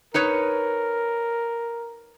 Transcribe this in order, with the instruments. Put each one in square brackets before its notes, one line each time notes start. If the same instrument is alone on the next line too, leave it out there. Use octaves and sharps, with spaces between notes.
[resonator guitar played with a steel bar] D#4 B4 C#5 [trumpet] A#4